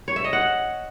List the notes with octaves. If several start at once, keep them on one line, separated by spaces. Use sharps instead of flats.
C#5
E5
D#5
F#5